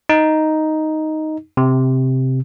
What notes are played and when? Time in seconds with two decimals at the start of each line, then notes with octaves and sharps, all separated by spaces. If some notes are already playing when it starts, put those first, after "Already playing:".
0.09 D#4
1.57 C3